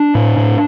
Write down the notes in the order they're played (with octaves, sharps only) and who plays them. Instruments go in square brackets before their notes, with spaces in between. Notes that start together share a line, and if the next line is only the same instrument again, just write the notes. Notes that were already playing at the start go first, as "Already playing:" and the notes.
Already playing: [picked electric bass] D4
A2
A2